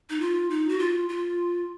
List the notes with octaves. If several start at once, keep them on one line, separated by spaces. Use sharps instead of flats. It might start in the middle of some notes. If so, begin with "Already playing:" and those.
D#4
F4
D#4
F#4
F4
F4